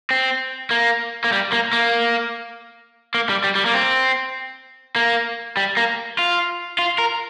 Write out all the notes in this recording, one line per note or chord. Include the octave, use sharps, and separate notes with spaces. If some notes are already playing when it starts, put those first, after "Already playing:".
C4
A#3
A#3
G3
A#3
A#3
A#3
G3
G3
G3
A#3
C4
A#3
G3
A#3
F4
F4
A#4